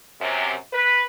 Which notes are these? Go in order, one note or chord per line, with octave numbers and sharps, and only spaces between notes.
F#2 C3
B4